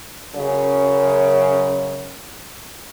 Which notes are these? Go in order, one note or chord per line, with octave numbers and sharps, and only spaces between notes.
F#2 C#3